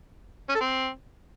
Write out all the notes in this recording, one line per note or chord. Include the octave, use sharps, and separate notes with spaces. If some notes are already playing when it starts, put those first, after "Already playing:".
C#4
A4
C4